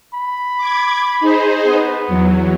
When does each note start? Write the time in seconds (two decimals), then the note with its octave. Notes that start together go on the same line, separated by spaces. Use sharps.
0.14 B5
0.57 D6 G#6
1.20 D#4 G#4 C5
1.66 B3
2.08 E2 F#3